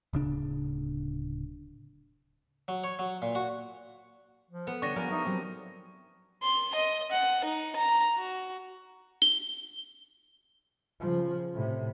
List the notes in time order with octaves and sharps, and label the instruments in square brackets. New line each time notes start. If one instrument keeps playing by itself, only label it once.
[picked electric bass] D1 C#3 D4
[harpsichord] F#3
C#5
F#3
A#2
F#4
[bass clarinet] F3
[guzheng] B3
[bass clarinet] D3 [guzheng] G3 D4 C#5 [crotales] C#6 A#6
[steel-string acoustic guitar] F3 D5 G#5 [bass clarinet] B3 [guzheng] A#4
[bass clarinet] D#4 [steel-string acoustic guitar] E5
[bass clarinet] F3 [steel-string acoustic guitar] F#3 B3 C4
[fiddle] C6
D#5
F#5
D#4
A#5
F#4
[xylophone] G7
[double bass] C#3 F3
A2 C3